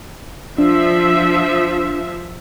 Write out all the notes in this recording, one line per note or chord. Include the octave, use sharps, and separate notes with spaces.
F3 D4 E5